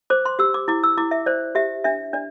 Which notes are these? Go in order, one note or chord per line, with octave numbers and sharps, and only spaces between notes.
C5 D6
C6
G4 E6
D6
E4 D6
E6
E4 D6
E5
C5 D5
G4 E5
D4 E5
D4 D5